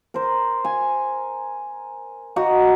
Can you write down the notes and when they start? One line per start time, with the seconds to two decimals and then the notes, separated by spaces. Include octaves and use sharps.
0.14 A#4 C5
0.65 G#5
2.36 D#4 F#4 A#5